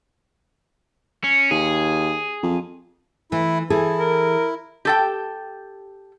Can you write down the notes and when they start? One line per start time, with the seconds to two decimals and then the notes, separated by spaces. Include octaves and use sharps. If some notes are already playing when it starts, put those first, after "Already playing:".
1.24 C#4
1.51 D#2 G#4
2.43 F2
3.32 E3 A3 E4
3.70 E3 E4 G#4 A4
4.00 A#4
4.85 G4 A4 G5